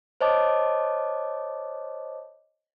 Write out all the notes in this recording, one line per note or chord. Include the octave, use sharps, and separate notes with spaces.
C5 C#5 D#5 A5 D6